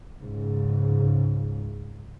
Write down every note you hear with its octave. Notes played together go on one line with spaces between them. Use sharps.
C#2 G#2 C#3